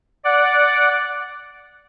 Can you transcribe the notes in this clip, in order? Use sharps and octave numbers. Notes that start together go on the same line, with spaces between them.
D5 F#5